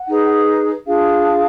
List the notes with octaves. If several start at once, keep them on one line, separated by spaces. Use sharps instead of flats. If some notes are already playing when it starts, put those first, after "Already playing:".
Already playing: F#5
D#4 G#4 B4
D4 F4 G#4 F5